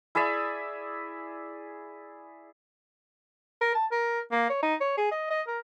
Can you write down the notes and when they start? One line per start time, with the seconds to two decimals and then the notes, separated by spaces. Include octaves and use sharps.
0.15 E4 G#4 D5 E5
3.61 A#4
3.75 A5
3.92 A#4
4.32 A#3
4.50 C#5
4.63 D#4
4.81 C#5
4.97 G#4
5.11 D#5
5.31 D#5
5.47 A#4